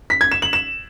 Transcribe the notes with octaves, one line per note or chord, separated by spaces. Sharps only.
B6
G#6
E7
F#7
E7